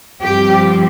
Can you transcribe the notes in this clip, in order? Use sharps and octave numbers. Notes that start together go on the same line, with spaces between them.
G2 F3 C4 G4